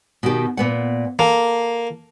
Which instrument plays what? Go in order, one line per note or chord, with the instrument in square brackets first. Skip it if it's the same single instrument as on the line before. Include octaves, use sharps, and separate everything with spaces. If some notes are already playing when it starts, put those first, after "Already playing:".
[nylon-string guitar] B2 D#3 G4
A#2 B3 F#5
[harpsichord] A#3 [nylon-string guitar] A4